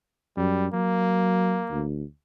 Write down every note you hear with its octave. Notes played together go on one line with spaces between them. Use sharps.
F#2 G3
F#3 A#3
D2